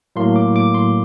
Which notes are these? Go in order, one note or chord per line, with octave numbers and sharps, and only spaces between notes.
A2 F#3 A#3 C6
D6
D6
C6